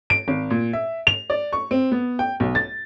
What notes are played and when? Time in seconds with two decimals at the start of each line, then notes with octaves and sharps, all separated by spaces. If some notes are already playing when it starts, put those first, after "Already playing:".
0.10 D7
0.28 G#1
0.50 A#2
0.73 E5
1.07 F7
1.30 D5
1.53 C#6
1.71 C4
1.92 B3
2.19 G5
2.40 B1
2.55 A6